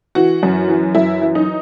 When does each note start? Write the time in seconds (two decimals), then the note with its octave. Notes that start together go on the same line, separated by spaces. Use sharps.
0.15 E3 F#4
0.43 F#2
0.68 E3
0.95 F#2 E4
1.22 E3
1.35 D#4